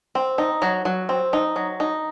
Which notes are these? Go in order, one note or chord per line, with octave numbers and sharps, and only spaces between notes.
C4
D#4
F#3
F#3
C4
D#4
F#3
D#4